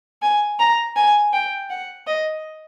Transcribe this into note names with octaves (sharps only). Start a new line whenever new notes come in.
G#5
A#5
G#5
G5
F#5
D#5